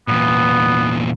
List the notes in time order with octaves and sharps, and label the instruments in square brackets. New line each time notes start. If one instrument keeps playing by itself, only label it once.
[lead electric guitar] E2 A#2 [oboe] B3